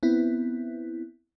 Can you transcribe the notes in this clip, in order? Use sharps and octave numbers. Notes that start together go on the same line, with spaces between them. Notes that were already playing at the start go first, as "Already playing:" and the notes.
B3 C4 E4